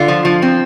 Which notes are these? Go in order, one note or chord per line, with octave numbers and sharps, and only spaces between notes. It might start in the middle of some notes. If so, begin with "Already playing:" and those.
Already playing: D3 F4
F3
F3
C4